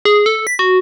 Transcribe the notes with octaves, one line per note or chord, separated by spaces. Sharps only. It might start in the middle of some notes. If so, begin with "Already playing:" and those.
G#4
A4
B6
F#4